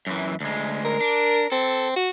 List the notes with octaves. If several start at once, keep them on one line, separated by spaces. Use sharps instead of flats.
F#2 E3
D2 G#3
A#4
D4
C4 A4
F#4